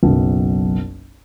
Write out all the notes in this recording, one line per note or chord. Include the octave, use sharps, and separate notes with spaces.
F#1 B1